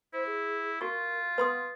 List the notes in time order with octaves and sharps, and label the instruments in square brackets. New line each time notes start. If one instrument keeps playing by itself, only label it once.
[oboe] E4 [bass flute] C5
[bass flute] G#4
[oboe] F4 [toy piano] F#4 C#6 [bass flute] A#4
[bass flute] B3 [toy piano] B4 C6 D#6